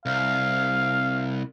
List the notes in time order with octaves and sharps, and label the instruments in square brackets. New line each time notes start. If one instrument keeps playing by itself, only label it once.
[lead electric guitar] C2 [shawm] F5